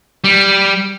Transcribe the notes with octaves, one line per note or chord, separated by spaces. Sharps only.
G3